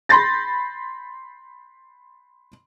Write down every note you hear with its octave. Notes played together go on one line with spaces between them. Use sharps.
B5 C6 G6 A6 A#6